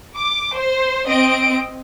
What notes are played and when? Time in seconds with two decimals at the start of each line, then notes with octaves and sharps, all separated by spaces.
0.16 D6
0.56 C5
1.08 C4 D#5 D7